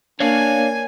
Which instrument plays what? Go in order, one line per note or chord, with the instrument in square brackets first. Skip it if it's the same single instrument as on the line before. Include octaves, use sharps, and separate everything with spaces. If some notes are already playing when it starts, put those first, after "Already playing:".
[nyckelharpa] A#3 [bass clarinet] D4 [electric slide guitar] C#5 D5 F5 [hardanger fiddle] G#5